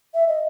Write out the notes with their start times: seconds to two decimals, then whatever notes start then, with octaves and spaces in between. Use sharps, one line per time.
0.14 E5
0.28 D#5